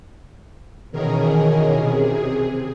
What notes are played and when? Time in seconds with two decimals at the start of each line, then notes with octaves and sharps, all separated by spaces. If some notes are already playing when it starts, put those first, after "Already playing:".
0.92 B2 D#3 E3 C#4 G#4 A#4
1.70 C3 G#4